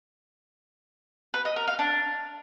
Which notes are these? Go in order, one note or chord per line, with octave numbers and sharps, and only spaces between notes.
B4
D#5
A#4
F5
D4